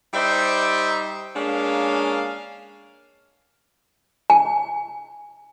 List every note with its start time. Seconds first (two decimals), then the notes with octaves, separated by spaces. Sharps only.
0.14 G3 D#4 C5 D5 E5
1.35 G#3 A#3 C#4 D4 F5
4.30 G#5